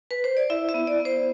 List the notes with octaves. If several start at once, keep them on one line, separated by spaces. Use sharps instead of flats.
B4
C5
D5
E4 E5
E5
B3
D5
B3
C5